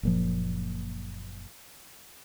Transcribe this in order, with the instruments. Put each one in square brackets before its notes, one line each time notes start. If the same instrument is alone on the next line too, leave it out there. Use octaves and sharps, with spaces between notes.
[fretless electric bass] F#1 A#2 F3